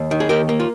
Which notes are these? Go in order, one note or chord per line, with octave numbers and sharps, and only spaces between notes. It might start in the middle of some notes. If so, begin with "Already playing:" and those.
Already playing: D#2
D#3
G#4
D#2 G4 A#4
A#3
F4